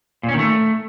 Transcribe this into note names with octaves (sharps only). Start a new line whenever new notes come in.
A#2
C#4
D#3
A3